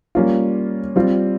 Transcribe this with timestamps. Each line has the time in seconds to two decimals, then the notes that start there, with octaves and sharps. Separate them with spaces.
0.15 G3 A#3 C#4 F4
0.96 G3 C4 F4